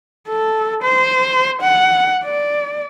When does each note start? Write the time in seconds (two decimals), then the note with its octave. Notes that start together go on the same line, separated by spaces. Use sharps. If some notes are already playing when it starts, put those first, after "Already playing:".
0.29 A4
0.83 C5
1.61 F#5
2.24 D5